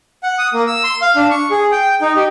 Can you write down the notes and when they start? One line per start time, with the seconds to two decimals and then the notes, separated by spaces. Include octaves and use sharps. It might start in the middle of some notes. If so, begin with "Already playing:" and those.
0.23 F#5
0.39 D#6
0.54 A#3
0.67 E6
0.84 C6
1.02 F5
1.16 D4
1.31 C#6
1.51 G#4
1.72 G5
2.01 D#4
2.16 G4